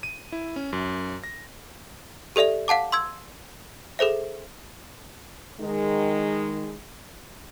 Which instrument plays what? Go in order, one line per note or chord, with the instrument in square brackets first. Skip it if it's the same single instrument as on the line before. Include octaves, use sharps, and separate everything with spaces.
[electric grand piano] D#7
E4
C#4
F#2
A#6
[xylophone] G4 A4 D5 E5 F7
F5 F#5 A5 D6
C6 E6 G#6
G#4 A4 C5 E5
[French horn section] D#3 G#3